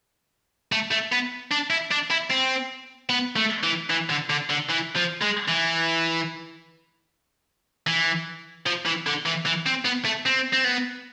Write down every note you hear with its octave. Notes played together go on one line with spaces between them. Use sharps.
A3
A3
B3
D4
E4
D4
E4
C4
B3
A3
E3
E3
D3
D3
D3
E3
F3
G#3
E3
E3
F3
E3
D3
E3
E3
C4
B3
A3
C4
C4
B3